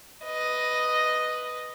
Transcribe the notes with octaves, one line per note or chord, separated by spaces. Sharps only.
B4 D#5